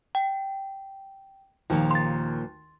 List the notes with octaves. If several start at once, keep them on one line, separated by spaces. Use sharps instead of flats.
G5
D#2 A#2 F3
C6 A6